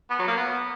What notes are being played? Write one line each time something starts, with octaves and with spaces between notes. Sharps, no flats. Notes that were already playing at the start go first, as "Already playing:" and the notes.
B3
F#3
A#3
B3